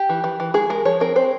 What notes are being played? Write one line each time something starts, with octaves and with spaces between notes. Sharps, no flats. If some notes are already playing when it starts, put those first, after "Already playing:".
Already playing: G4
E3
E3
E3
G#3 G#4
G#3 A#4
F3 C#5
C4 A#4
C4 C5